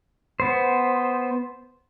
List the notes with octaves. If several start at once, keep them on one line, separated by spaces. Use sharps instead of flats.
B3 C5